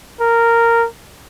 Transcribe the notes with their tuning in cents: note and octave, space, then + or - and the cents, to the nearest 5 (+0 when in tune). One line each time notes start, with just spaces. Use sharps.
A#4 -10